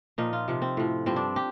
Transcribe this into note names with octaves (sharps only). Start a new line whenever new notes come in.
A#2 F3 D#4
F4
C3 F3
C4
A2 F3
G2 F3 C4
D4
G4